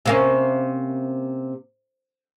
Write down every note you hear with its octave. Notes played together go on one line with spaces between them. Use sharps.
C3 A#3 C#4